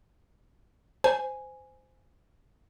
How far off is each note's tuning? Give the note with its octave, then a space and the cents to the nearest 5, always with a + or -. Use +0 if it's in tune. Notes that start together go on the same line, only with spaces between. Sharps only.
C5 -15 G#5 +0